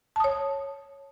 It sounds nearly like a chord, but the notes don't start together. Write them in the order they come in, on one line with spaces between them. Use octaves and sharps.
A5 D#6 C#5